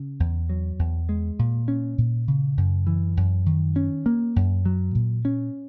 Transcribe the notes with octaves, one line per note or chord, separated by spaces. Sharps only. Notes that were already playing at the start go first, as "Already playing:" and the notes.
Already playing: C#3
E2
F#3
E2
G#3
A#2
C#4
A#2
C#3
F#2
E3
F#2
D#3
C#4
A#3
F#2
F#3
A#2
C#4